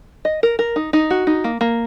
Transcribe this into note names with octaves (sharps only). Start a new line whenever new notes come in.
D#5
A#4
A#4
D#4
D#4
F#4
D#4
A#3
A#3